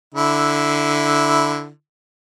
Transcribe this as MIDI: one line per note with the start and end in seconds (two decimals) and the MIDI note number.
0.14 1.69 50
0.14 1.69 64